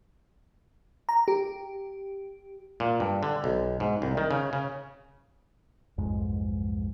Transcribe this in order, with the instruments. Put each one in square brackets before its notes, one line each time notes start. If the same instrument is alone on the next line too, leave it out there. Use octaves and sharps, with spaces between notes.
[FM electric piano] A#5
G4
[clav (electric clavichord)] A#2
G2
D3
B1
G#2
C2
D#3
C#3
C#3
[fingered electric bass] B1 F2 G#2 G#3